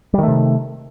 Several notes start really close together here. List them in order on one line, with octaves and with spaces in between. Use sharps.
G3 D#3 A3 C3